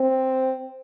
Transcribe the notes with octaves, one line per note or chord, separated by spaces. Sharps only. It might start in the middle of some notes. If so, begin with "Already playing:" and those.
Already playing: C4